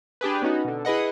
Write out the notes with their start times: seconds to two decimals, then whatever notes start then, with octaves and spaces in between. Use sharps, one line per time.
0.21 D4 G4 G#4 B4
0.42 B3 C#4 D#4 F#4
0.65 B2 D3
0.85 E4 G#4 B4 D#5 F#5